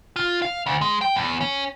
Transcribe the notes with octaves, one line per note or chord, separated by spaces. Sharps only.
F4
F5
D2
G#3
G5
E2
C#4